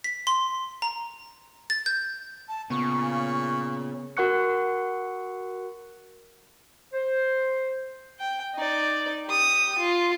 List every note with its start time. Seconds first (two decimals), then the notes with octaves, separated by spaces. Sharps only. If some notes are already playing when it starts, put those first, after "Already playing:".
0.04 B6
0.27 C6
0.82 A#5
1.70 A6
1.86 G6
2.48 A5
2.70 A#2 C#3 B3 C#6
4.17 F#4 A#4 F#5 C#6 F#6 C#7
6.93 C5
8.19 G5
8.55 D#4 D5
9.27 G4 D#6
9.78 F4